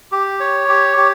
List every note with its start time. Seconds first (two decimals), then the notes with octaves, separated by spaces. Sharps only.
0.12 G4
0.40 C#5
0.68 G4
0.97 G4